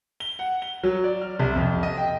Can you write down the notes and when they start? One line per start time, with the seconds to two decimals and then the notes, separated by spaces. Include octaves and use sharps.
0.20 G7
0.39 F#5
0.62 G7
0.84 F#3
1.04 D5
1.21 F6
1.39 C2
1.56 F2
1.83 D#5
1.97 G5